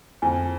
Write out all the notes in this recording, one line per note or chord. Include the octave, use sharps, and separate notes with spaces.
F2 G#5